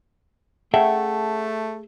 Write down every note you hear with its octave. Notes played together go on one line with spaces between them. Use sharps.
A3 C#4 G#4 E5 F#5 G5 A5